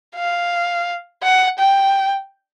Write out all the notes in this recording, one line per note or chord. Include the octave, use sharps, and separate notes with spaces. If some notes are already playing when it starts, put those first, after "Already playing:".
F5
F#5
G5